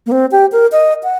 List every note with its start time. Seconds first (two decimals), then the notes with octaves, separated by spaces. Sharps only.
0.06 A#3
0.12 C4
0.32 G4
0.52 A#4
0.72 D#5
1.04 F#5